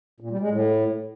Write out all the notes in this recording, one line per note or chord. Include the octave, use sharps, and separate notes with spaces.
A#2
G3
G#3
A2